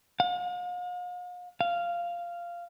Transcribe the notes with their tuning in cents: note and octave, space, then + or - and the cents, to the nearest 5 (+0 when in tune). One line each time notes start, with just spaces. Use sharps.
F5 +45
F5 -10